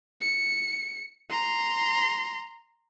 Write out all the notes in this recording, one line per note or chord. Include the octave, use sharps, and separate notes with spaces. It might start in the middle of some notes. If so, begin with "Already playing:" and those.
C#7
A#5 C6